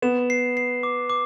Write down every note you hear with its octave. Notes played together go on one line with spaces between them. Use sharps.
B3 E7
C7
C7
D6
D6